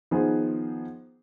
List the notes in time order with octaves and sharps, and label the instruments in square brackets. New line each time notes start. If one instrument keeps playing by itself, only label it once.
[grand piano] D#3 F3 B3 G#4 C5